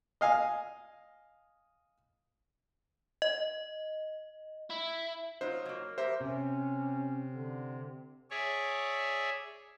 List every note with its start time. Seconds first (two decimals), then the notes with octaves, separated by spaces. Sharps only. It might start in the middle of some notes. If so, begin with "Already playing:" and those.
0.21 D#5 F5 G#5
3.22 D#5
4.70 E4
5.41 F#3 D#4 F4 C5
5.65 F#3 A#3
5.98 G4 A#4 C5 E5
6.21 C3 C#4
7.30 D3
8.31 G#4 C#5 D5 E5